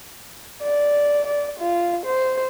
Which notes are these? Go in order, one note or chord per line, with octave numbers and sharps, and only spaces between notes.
D5
D5
F4
C5